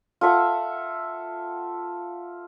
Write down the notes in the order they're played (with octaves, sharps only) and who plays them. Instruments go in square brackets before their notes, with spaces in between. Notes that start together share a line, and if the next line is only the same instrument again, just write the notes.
[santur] F4 A4 E5 F#5